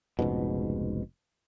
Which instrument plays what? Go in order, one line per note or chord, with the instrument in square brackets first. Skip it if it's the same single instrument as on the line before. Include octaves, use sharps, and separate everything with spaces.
[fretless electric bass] F1 C#2 G#2 B2